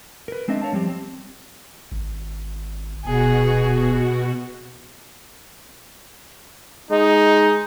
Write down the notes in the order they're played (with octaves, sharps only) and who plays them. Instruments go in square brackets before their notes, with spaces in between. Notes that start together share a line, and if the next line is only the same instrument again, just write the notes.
[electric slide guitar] A#4 B4
G#3 C4 D4 D#5 E5
C#5 F5 A5
F3 G3 C4 G4
C4
[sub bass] G#1
[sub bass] D#1 [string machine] B2 F#4 [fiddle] G#4
[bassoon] G#3 [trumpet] D#4